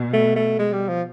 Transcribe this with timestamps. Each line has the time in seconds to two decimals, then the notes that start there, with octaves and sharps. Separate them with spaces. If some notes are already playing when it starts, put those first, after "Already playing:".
Already playing: B2
0.13 A3
0.36 A3
0.59 G#3
0.73 G3
0.89 F3